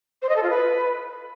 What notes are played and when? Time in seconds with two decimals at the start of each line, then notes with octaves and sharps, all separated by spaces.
0.22 C5
0.29 D#5
0.36 A4
0.43 F4
0.50 B4